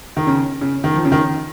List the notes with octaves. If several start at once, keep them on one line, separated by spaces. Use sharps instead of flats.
D#3
C#3
C#3
D#3
F3
C#3
D#3